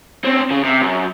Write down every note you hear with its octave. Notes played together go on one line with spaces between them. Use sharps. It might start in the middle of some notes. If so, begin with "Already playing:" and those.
C4 C#4
C#3
C3
F#2